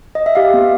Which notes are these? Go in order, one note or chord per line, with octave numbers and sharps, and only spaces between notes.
D#5
E5
G4 F5
B3